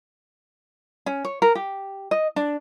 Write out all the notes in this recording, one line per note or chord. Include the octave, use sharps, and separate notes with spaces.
C#4
C#5
A#4
G4
D#5
D4